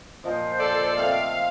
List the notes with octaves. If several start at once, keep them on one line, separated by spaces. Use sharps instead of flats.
A#2 F3 C5 D#5
A4 D5
A3 C4 F5